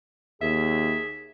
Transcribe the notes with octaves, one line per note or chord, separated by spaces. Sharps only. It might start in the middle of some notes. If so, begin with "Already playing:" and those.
D#2 G#4 E5